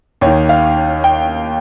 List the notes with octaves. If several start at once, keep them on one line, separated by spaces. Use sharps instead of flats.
D#2 C#5
D#3
F5
G5